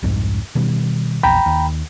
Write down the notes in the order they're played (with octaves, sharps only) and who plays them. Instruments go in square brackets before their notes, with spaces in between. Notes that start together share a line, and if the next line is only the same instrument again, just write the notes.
[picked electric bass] C2 F2 G#2
B2 D#3 G3
[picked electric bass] A#1 E2 [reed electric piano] G5 A#5 B5
[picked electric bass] D#2